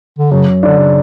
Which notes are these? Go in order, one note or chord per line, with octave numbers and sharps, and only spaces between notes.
D3
F#2 C#3
D3 D4
C#3